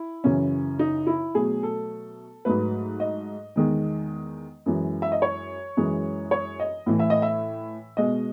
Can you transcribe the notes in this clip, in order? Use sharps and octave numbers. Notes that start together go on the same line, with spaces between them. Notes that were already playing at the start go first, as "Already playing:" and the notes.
Already playing: E4
F#2 C#3 E3 C#4
D#4
E4
B2 F#3 A3 G#4
A4
G#2 F#3 A3 B4
D#5
E2 D#3 G#3
F#2 E3 G#3
E5
D#5
C#5
F#2 E3 G#3
C#5
D#5
A2 E3 A3
E5
D#5
E5
B2 G#3 D#5